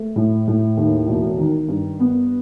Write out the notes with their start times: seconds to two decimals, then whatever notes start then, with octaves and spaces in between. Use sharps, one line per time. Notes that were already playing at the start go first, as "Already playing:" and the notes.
Already playing: A3
0.16 A2
0.48 A2
0.77 D#2
1.08 E1
1.38 D#3
1.68 G2
2.00 B3